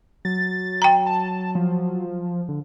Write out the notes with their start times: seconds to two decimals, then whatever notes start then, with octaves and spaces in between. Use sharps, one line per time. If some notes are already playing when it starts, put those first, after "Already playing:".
0.25 F#3 A6
0.82 G5 A#5
1.06 A5
1.55 F3
2.49 D3